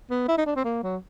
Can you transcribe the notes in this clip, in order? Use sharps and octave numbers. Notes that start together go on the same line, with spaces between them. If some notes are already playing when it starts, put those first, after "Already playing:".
B3
E4
D#4
D4
C4
A#3
F#3